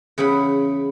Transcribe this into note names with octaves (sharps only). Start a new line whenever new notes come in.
E2 C#3 G#4 F#5 G5 B5